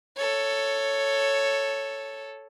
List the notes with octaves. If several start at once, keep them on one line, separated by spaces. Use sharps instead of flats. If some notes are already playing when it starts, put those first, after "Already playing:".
A4 C#5